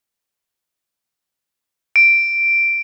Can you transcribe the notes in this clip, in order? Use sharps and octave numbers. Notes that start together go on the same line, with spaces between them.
D7